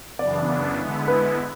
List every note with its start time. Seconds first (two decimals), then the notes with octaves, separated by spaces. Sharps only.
0.19 F#2 C#3 E3 B3 D4 D5
0.78 D3 G#3 B3 E4
1.08 B4